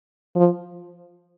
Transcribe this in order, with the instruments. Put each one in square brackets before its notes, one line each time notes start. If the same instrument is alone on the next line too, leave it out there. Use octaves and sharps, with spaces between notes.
[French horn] F3